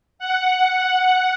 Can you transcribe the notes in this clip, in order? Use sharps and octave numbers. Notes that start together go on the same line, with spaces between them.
F#5